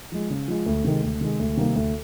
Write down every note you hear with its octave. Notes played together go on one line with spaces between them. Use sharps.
F3 G#3
C#3
F3 G#3
D2
C3 D#3 G#3
D2
C3 D#3 G#3
D2
C3 D#3 G3 A#3
D2